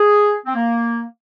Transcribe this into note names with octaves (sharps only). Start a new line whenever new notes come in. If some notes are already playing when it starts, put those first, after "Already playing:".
Already playing: G#4
C4
A#3